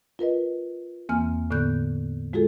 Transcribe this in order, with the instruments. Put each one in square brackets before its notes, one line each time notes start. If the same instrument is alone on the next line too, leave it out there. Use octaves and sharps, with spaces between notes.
[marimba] F4 A#4 B4 D#5
E2 E3 A#3 C4 G#5 F6
A2 D3 B3 F#6 G6
G#3 F4 F#4 G#4 A4